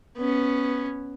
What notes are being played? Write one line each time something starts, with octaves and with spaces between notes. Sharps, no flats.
B3 C#4